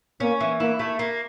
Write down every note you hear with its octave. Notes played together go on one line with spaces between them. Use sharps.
A#3 C#4
E3
A#3 E4
A3
A#3